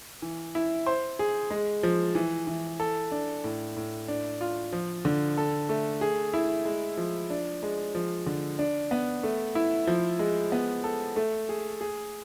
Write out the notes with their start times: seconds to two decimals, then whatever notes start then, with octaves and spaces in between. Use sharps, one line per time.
0.22 E3
0.55 E4
0.87 C5
1.19 G#4
1.50 G#3
1.83 F3
2.15 E3
2.47 E3
2.80 A4
3.12 D4
3.44 A2
3.76 A2
4.08 D4
4.41 F4
4.73 F3
5.05 D3
5.38 A4
5.69 A3
6.01 G#4
6.34 E4
6.65 G#3
6.97 F3
7.30 D4
7.63 G#3
7.95 F3
8.26 D3
8.59 D4
8.91 B3
9.23 A3
9.55 E4
9.87 F3
10.19 G#3
10.52 B3
10.84 A4
11.16 A3
11.49 G#4
11.81 G#4